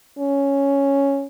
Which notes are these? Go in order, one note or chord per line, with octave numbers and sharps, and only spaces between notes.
C#4